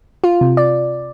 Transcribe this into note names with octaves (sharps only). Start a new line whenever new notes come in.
F4
C3
D5